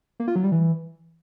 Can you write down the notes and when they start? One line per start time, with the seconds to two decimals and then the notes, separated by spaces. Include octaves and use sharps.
0.20 A#3
0.28 F4
0.36 F#3
0.44 G3
0.52 E3